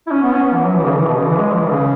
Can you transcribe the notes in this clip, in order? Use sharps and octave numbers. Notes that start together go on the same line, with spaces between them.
E4
C#4
B3
C#4
B3
E3
F#3
E3
C#3
E3
B2
C#3
E3
G#3
E3
C#3